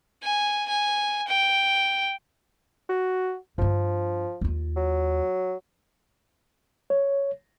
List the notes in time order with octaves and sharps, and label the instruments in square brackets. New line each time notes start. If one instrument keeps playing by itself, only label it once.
[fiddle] G#5
G#5
G5
[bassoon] F#4
[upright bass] G2 D4 [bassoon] F3
[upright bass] D#2 F4
[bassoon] F#3
[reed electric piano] C#5